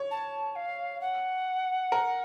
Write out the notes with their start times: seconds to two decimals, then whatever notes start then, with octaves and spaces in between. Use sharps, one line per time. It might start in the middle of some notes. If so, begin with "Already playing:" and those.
Already playing: C#5
0.11 A5
0.55 F5
1.01 F#5
1.92 A#4